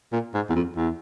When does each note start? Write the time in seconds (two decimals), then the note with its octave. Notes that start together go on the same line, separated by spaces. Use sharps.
0.13 A#2
0.34 G#2
0.50 E2
0.56 F2
0.76 E2